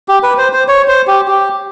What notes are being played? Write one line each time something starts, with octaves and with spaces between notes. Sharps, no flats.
G4
B4
C5
C5
C#5
C5
G4
G4